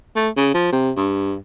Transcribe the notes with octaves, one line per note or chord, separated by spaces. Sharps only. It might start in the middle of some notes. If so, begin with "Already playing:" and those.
A3
C#3
F3
C3
G2